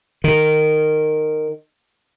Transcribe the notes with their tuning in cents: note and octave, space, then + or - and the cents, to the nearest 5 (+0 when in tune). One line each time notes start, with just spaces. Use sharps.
D#3 -15